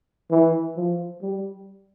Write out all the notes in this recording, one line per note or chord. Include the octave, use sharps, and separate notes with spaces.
E3
F3
G3